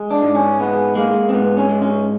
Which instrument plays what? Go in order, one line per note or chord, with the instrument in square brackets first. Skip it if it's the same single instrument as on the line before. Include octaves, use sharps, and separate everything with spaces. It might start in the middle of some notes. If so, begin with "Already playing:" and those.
Already playing: [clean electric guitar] G#3
D4
G#2
C#4
G#3 B3
G#3 A#3
C4
G#2 B3
C#4
G#3
C#4